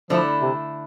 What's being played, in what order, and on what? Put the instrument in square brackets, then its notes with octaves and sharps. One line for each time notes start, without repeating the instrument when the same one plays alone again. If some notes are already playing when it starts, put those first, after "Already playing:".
[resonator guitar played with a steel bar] D3 A3 E4 [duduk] F3
[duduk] C3